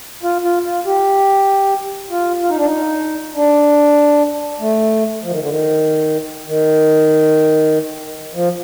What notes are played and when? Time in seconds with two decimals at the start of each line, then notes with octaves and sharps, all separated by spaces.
0.23 F4
0.44 F4
0.65 F4
0.86 G4
2.11 F4
2.42 F4
2.49 D#4
2.57 D4
2.66 D#4
3.35 D4
4.60 A3
5.23 F3
5.31 D#3
5.40 D3
5.49 D#3
6.47 D#3
8.34 F3